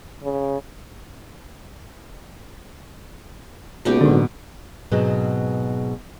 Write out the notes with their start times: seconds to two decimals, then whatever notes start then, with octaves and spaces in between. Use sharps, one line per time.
0.23 C#3
3.85 C#2 B2 A#3 D#4 G4
4.01 G#1 A2 D3 F#3
4.91 G#2 B2 F#3 G#3 B3 C4